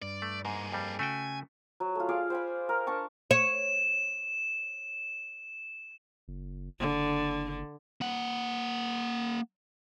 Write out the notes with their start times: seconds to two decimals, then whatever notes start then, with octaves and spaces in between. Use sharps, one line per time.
0.02 G2 D5
0.22 A3
0.45 G#2 A#3 G#4
0.72 F2 G3
0.99 C#3 A3 F#4 G5 G#5
1.80 F#3
1.95 A3 F4
2.09 F4 G#4 D5 F5
2.30 C5 G#5 B5
2.69 A#4
2.87 D4 A5 C#6
3.31 C#5 E7
6.28 F#1
6.79 F#1 D3
8.01 A#3 F#5